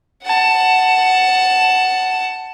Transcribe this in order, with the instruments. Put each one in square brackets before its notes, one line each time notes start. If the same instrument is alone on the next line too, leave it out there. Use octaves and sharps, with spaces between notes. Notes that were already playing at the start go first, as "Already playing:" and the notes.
[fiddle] F#5 A5